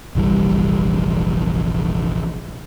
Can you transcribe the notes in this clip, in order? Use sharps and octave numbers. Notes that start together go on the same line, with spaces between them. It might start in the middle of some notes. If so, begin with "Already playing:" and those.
F1 A#1 E3 G3